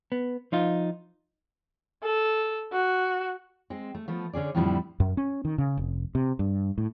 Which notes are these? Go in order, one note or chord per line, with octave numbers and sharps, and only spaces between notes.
B3
F3 D#4 F4
A4
F#4
G#3 C4
A3
F3 A3 B3
D3 C#4 G#4 D5
F2 A2 D3 F3 G3 E4
F#2
C#4
D#3
C#3
F1
C3
G2
A2